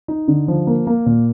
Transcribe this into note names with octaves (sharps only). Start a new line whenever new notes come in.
D#4
D3
F3
A#3
A#3
A#2